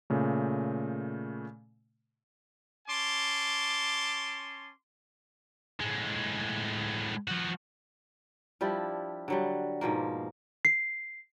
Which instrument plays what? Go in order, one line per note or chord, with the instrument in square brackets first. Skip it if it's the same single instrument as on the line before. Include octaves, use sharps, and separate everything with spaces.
[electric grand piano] A#2 C#3 A3
[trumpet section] C#4 A5 C6 D6
[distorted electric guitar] A2 G#3
F3 F#4
[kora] F3 G3 D4 E4
D3 F#3 G3
G#2 B2 F3 A#3
[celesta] C7